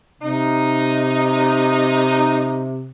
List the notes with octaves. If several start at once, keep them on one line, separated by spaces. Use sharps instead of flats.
C3 D#4